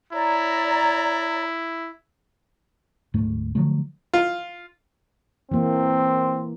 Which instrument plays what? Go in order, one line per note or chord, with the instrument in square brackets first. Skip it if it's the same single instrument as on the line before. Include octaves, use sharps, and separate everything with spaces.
[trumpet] E4 [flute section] C#5 D5 A#5
[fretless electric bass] D1 G#2 A3
D3 F3 F#3 A3
[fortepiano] F4
[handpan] E3 A#3 [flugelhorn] C4